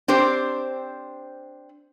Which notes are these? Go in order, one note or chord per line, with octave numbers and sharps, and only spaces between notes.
C4 D4 G4 C5